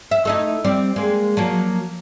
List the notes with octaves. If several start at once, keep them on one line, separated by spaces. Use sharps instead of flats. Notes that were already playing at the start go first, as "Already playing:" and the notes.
E5
A3 D#4 E4
G3 C4 D5
G#3 A#3
F3 F#3 A#3